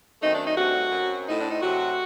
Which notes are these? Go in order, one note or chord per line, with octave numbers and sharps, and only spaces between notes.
F#2 D#3 A3 C4 D#4
D4
D#4
G2 D3 A3 C4 F#4
F#2 F#3 C4
A2 A3 C4 D#4
D4
D#4
C3 F#3 A3 C4 F#4